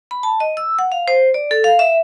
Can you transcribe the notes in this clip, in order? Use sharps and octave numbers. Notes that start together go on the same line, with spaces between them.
B5
A5
D#5
E6
F#5
F5
C5
D5
A4
F5
E5